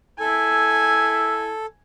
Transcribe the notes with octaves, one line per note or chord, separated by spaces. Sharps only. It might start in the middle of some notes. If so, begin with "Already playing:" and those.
E4 A4 G#5